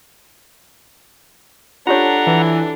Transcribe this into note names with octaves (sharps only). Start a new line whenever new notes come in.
D4 F4 G4 A4 C#5 F#5 A#5
E3